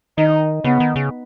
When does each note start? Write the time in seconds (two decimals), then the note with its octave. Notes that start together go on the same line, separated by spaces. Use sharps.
0.18 D#3 D#4
0.64 C#3 B3
0.80 D#3
0.96 C#3